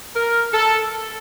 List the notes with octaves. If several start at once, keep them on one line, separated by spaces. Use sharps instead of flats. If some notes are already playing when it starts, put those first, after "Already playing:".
A#4
A4